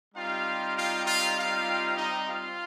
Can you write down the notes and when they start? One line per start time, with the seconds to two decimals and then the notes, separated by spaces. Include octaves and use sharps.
0.15 G3 C4 D#4 F4 G4 F5
0.76 F4 F5
1.06 F4 F5
1.36 F4 F5
1.97 D#4 D#5
2.27 F4 F5